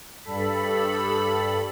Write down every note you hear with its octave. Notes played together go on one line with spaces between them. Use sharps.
G2 A4 B5